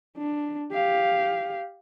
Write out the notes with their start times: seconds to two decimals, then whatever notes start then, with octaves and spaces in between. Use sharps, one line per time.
0.18 D4
0.72 G4 F5